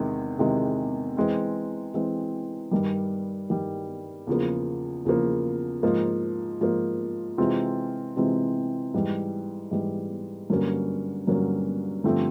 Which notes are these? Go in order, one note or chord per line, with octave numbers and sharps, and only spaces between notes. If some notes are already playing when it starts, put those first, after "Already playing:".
Already playing: E2 C3 D#3 G#3
E2 C3 D#3 G#3
E3 G#3 C4
E3 G#3 C4
G2 D#3 G3
G2 D#3 G3
E2 C#3 F3 A#3
E2 C#3 F3 A#3
G#2 F3 A#3
G#2 F3 A#3
C3 E3 G#3 C4 F4
C3 E3 G#3 C4 F4
G#2 E3 G3
G#2 E3 G3
G2 D3 F#3 A#3 C#4
G2 D3 F#3 A#3 C#4
G2 D3 F3 A3 C4